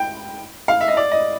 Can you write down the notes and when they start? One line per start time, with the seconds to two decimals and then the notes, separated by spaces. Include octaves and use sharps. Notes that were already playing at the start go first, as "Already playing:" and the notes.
Already playing: G5
0.68 F5
0.81 E5
0.88 D#5
0.97 D5
1.12 D#5